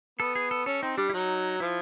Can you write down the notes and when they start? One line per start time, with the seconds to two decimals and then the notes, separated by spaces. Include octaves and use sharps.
0.19 B3 A4
0.35 G#4
0.51 A4
0.66 C#4 A4
0.82 C4 D#4
0.98 G3 D4
1.09 E4
1.13 F#3 D#4
1.60 F3 E4